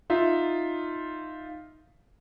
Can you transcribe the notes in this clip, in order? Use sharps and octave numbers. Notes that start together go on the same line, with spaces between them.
D#4 F4 E5